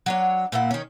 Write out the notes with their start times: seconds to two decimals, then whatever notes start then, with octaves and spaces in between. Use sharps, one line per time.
0.06 F#3 D4 C#5
0.52 A#2 A#3 E4 F#5
0.71 D#3 C#4